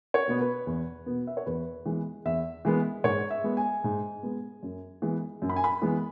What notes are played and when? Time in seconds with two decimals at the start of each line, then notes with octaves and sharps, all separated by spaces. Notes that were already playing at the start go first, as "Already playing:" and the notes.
0.14 C#5
0.28 B2 B3
0.41 B4
0.67 E2
1.06 B2 B3
1.27 E5
1.37 C#5
1.46 E2 B4
1.86 E3 G#3 B3
2.25 E2 E5
2.65 E3 G#3 B3
3.04 G#2 C#5
3.31 E5
3.44 G#3 B3
3.57 G#5
3.84 G#2
4.23 G#3 B3
4.63 F#2
5.02 E3 G#3 B3
5.42 F#2
5.49 B5
5.56 G#5
5.64 B5
5.82 E3 G#3 B3